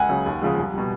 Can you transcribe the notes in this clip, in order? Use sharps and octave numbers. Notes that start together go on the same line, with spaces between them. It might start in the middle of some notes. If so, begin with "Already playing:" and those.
Already playing: C#2 F#5 G#5
C#3 F#3
D#2
C#3 F3 G#3
C2
B2 G3